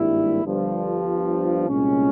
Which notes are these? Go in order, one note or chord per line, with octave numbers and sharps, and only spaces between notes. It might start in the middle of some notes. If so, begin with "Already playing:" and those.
Already playing: G#1 G2 G3 A#3 E4
G1 G2 F3
C2 A#2 G#3 C#4